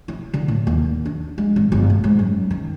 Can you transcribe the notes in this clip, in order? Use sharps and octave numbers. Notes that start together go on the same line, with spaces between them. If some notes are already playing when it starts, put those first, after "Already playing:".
E4
D3
A2
D#2
D4
G#3
G#1
G1
A2
G#2
F#2
D#3